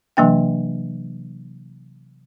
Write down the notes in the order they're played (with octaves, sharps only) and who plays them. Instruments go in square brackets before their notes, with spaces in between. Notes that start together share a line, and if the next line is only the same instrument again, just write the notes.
[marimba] C3 E3 F#3 A#3 D4 G5